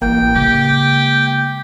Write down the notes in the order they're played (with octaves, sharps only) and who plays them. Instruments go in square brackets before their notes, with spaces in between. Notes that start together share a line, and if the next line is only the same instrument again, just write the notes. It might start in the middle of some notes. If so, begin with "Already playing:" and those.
[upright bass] A1 A2 [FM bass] A#3 [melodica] G5
[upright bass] C#3 G#3 [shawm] G4